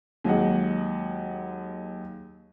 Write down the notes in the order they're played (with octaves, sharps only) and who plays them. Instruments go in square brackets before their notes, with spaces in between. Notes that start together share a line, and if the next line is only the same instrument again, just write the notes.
[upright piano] D#2 F#3 G#3 D#5 F#5